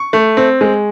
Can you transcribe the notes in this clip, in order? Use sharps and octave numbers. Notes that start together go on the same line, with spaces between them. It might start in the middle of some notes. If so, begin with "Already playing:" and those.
Already playing: C#6
A3
C4
G#3